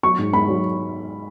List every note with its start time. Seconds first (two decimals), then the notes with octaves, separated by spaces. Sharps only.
0.03 F#3 C#6
0.19 G#2
0.33 G#2 B5
0.48 F#3